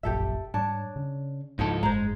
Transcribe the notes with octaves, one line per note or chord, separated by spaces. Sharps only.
F1 A#1 F#2 G4 A4 E5
G#2 G3 D4 C#5 A5
C#3
C#2 G#2 F3 D#4 E4 A4 A5
F#1 G#2 G#3 C5 A#5